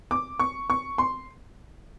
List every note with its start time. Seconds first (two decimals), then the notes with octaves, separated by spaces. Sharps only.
0.11 D6
0.39 C#6
0.70 C#6
0.98 C6